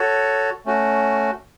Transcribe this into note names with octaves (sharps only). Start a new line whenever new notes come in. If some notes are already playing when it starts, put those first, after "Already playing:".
Already playing: F#4 A4 C#5
A3 C#4 F#4